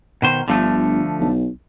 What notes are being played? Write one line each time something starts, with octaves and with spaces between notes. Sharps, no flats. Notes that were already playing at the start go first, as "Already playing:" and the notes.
B2 D#3 C5
G1 D3 F3 A3
B1